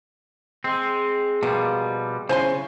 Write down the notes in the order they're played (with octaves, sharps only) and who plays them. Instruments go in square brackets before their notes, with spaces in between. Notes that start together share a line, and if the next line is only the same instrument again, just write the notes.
[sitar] G#3 [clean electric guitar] C4
[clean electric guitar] B2 F3 G3 [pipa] A#3
[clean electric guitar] C#3 [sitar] F#3 E4 C#5 [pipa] C5 G#5 C6